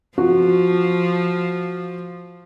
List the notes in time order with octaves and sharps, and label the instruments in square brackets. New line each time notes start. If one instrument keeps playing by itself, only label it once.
[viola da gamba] F3 [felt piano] F4 F#4